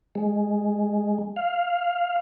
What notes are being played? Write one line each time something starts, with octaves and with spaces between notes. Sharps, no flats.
G#3
F5